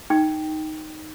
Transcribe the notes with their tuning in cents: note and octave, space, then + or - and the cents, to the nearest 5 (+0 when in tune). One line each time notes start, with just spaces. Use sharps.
D#4 +0 G5 +0